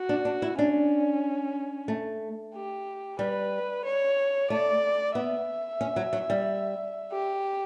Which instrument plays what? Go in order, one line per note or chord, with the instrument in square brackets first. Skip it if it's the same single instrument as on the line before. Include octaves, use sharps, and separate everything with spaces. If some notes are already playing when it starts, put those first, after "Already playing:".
Already playing: [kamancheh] F#4
[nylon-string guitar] D4
D4
E4
[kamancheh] C#4 [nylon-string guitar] D4
[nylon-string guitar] A3
[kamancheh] G4
[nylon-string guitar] G3 [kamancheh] B4
[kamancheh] C#5
[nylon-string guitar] A3 [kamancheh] D5
[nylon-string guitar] B3 [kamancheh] E5
[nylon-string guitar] C#4
F#3
F#3
G3
[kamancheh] G4